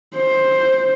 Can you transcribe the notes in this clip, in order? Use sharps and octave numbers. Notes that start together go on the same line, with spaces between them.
C5